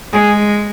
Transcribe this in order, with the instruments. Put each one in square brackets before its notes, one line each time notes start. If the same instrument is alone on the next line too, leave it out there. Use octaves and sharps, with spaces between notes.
[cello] G#3 [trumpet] G#4